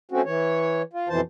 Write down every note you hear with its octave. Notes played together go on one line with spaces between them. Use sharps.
A3 C4 C#4 F#4
E3 C#5
F4
F2 B2 E3 C5 A5